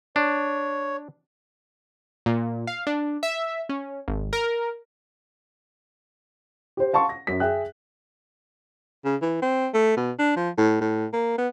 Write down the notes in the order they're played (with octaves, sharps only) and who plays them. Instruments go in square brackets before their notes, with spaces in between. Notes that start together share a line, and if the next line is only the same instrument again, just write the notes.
[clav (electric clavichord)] D4 [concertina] C#5
[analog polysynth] A#2
F5
D4
E5
C#4
G#1
A#4
[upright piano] G4 C5
F5 A5 C6 C#6
A#6
F#2 B6
G#4 E5 G5 F#6
[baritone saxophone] C#3
E3
C4
A3
B2
D4
F3
A2
A2
A#3
B3